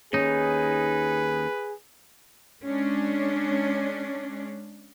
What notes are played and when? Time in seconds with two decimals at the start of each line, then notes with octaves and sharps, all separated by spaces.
0.13 D#2 C#4 D#4 G#4 B4
2.63 G#3 C#4 D4